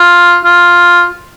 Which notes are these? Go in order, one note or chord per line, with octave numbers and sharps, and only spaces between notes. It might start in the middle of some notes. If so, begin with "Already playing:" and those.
Already playing: F4
F4